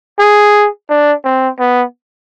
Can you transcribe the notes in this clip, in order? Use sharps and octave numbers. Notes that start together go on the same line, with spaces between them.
G#4
D4
C4
B3